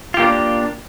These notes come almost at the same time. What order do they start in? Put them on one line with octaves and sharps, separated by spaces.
F4 G4 A#3 D4